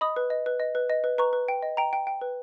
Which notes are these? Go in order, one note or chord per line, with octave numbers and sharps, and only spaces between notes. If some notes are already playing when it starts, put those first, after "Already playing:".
D#5 B5 D#6
B4
D#5
B4
D#5
B4
D#5
B4
B4 A#5 C#6
B4
G5
D#5
G5 A#5
G5
G5
B4